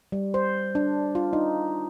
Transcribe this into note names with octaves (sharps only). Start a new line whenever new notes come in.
G3
C5
D4
F4
D#4